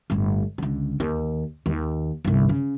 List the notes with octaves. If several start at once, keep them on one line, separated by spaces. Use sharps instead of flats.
G1 A2
C#2 D3
D#2
D#2
G1 C2
C#3